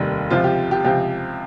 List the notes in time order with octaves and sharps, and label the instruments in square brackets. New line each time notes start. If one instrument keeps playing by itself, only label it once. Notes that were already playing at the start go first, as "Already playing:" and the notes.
Already playing: [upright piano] F1 D#2 D#3 G3
C#2 C3 F3 F4
G4
G4
C#2 C3 F3 G4